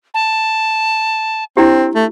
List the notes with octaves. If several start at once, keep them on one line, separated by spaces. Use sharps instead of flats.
A5
C4 D4 E4 G4
A3